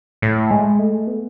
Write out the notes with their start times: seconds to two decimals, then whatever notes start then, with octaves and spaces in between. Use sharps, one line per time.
0.22 A2
0.51 G#3
0.79 A3
1.07 B3